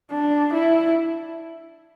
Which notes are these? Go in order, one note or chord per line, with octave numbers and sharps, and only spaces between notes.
D4
E4